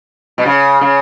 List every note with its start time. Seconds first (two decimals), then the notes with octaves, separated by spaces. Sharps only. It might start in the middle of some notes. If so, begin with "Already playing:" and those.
0.38 B2
0.46 C#3
0.81 C#3